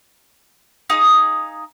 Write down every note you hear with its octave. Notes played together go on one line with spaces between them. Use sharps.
D#4 G#4 F5